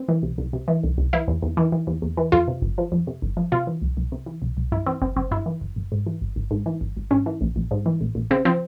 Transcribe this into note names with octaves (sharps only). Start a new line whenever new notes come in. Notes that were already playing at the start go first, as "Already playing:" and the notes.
Already playing: C4
E3
C2
C2
C3
E3
C2
C2
E3 E4
E2
E2
E3
E3
E2
E2
E3
F2 F4
C3
G1
F3
F2
C3
G1
F3
C3 F4
E3
C2
C2
C3
E3
C2
C2
G2 E4
E3 C4
G1 C4
G1 C4
G2 E4
E3
G1
G1
G#2
E3
G#1
G#1
G#2
E3
G#1
G#1
G#2 C#4
E3
A#1
A#1
G#2
E3
A#1
A#1
C#3 C4
F3 C4